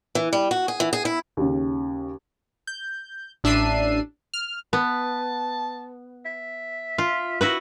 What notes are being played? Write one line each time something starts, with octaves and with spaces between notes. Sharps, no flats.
E3
G3
F#4
G#4
E3
G#4
E4
D#2 C#3
G6
A1 D4 E5 E6 C7 D#7
F6
B3 A5
E5
F4
E4 F#4 A#4 B4